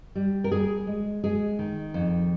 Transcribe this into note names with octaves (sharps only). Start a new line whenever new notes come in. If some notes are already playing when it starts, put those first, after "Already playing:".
G3
A#4
G3 G#4
G#3
G#3 G#4
D#3
F2